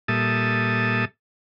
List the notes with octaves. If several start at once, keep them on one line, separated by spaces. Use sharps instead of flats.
A#2 G3 A4 E5 A5 D#6